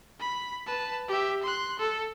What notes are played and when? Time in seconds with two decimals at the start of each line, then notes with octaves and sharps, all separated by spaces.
0.20 B5
0.66 B4 A5
1.08 G4 E5
1.43 C6 F#6
1.79 A4